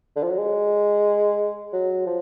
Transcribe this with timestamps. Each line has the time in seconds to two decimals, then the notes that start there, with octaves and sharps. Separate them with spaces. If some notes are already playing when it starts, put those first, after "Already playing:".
0.16 D3
0.23 F3
0.30 F#3
0.38 G#3
1.73 F#3
2.06 F3